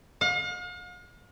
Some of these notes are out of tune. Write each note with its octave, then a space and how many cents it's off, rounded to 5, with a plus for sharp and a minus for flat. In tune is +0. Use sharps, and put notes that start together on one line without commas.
F5 +45